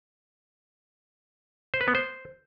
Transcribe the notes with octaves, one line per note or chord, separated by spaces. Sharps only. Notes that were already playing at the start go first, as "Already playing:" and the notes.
C5
B4
B3
C5